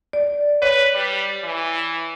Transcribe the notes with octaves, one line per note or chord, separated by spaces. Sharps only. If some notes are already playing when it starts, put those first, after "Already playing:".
D5
B4 C#5
G3
E3